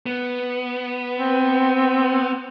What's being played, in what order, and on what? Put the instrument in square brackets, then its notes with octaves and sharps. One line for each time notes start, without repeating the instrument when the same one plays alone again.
[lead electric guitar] B3
[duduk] C4